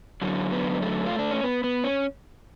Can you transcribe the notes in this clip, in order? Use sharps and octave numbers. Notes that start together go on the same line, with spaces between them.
F#2 D3 F#3
B3
A3
F4
D4
C#4
B3
B3
C#4